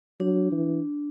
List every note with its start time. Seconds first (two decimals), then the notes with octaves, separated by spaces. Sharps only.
0.20 F#3 D4
0.52 E3